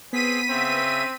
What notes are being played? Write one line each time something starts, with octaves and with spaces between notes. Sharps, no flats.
B3 C4 G#4 B6 D#7
C#3 C4 E5